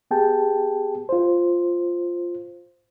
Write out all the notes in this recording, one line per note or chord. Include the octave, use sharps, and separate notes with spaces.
B3 G4 G#4 G5 A5
F4 C5